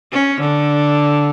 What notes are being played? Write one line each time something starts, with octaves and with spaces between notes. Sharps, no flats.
C#4
D3